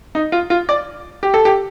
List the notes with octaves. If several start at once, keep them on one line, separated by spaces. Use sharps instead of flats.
D#4
F4
F4
D5
G4
A4
G4